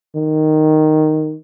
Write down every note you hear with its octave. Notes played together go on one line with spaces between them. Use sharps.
D#3